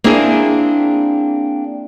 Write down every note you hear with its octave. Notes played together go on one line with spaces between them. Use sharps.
A#3 C4 D4 E4 G#4